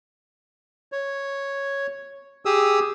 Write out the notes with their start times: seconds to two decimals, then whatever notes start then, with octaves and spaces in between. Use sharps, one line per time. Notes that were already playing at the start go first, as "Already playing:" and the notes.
0.92 C#5
2.45 G4 G#4 D#6 E6